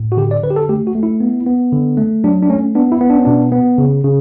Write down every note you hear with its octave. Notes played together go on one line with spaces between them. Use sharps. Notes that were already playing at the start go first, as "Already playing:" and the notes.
Already playing: A2
F#4
D3 G4
D5
D3 B4
G4
A4
A3 G4
F#4
A3
E4
B3
B3
D3
A3
F#3 D4
D4
A3 C#4
B3 D4
E4
B3
D4
C#4
B2 D4
B3
C#3
C#3